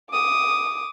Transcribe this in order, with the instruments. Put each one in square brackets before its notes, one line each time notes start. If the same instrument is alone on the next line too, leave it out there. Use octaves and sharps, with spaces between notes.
[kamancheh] D6 D#6